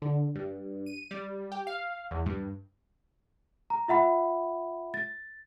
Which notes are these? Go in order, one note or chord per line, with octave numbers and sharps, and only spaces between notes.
D3
G2
D#7
G3
G4
F5
E2
G2
A#5
F4 E5 F#5 B5
A6